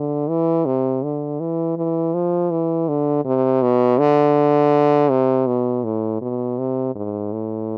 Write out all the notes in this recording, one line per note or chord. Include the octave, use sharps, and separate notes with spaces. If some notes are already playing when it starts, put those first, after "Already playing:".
Already playing: D3
E3
C3
D3
E3
E3
F3
E3
D3
C3
B2
D3
C3
B2
A2
B2
C3
G#2
A2